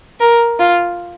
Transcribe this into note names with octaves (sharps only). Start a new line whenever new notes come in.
A#4
F4